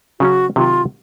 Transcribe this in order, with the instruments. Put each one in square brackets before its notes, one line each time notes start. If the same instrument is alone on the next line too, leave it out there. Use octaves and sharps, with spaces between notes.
[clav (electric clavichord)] C#3 F#3 C#4 [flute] F#4
[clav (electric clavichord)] C3 D#3 F#3 [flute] F4